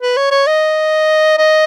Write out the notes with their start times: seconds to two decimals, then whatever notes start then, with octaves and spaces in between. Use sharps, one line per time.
0.01 B4
0.17 C#5
0.31 C#5
0.47 D#5
1.38 D#5